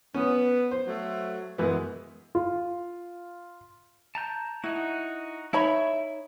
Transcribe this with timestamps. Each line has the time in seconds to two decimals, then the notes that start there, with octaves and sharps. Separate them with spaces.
0.14 B3 C#4
0.71 C5
0.86 F#3 A3
1.58 F#2 E3 G#3 B3
2.35 F4
4.15 A5 A#5 G6
4.64 D#4 E4 F#4
5.53 D#4 E4 C#5 E5 B5